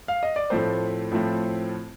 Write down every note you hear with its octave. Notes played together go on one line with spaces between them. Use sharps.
F5
D#5
D5
A2 F3 A3 C4 C5
A2 F3 A3 C4